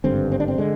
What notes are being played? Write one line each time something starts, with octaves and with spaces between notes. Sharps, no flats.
G#1 G2 D3 C4
C4
D4
C4
D3 G#3